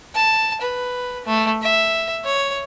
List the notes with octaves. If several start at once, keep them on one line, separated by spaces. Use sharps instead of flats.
A5
B4
A3
E5
C#5